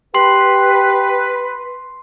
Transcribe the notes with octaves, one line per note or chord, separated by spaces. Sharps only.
G4 B4 C6 C7 F#7